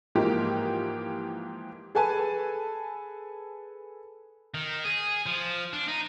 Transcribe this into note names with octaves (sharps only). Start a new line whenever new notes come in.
G#2 E3 F3 A#3 G4
G#4 A4 B4 G#5 A5
D#3
G#4
F3
D4
D#4